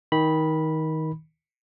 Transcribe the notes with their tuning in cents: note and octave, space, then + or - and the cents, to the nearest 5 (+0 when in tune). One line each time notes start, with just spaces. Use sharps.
D#3 +20 B5 -10